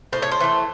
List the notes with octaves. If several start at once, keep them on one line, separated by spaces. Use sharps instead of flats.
A2 C5
C#5
C5
E3 A3